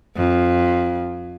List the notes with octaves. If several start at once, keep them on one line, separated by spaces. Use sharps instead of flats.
F2